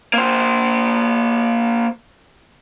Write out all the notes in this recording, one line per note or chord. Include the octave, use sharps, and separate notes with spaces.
A#3 C5